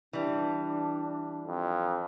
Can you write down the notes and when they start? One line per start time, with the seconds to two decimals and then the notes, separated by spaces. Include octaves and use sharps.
0.13 E3 G3 D4
1.47 F2